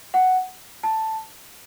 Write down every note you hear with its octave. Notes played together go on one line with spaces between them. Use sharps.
F#5
A5